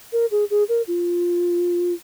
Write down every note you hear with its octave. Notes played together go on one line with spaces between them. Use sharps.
A#4
G#4
G#4
A#4
F4